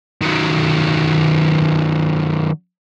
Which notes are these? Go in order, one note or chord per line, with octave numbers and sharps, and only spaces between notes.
D#3 F#3